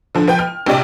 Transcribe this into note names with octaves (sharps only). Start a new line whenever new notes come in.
D3 F3
F3 B4 G5
F6
A#1 C3 G4 D5